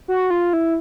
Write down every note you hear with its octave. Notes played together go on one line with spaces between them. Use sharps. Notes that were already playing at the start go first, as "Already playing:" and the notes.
F#4
F4
E4